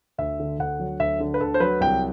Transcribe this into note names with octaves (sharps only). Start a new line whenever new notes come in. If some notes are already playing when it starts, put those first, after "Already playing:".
D2 E5
D3
D2 F#5
F#3
D2 E5
D3
B4
D2 A4
C5
F#3 B4
C2 G5